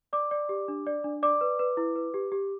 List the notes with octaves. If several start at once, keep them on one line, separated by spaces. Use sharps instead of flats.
D5 D6
D5
G4
D4
D5
D4
D5 D6
B4
B4
E4
B4
G4
G4